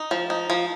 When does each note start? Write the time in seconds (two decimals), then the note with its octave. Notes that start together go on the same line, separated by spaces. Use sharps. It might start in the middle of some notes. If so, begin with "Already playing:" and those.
Already playing: D#4
0.11 F3
0.30 D#4
0.50 F3